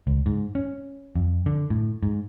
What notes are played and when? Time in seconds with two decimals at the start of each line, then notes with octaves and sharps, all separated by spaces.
0.07 C#2
0.26 G#2
0.55 C#4
1.16 F2
1.46 D3
1.70 A2
2.03 G#2